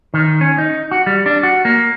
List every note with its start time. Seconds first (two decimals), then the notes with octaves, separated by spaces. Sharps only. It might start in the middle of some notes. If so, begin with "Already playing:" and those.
0.14 D#3
0.41 C#4
0.58 D#4
0.91 F#4
1.06 G3
1.26 D4
1.43 F#4
1.65 A#3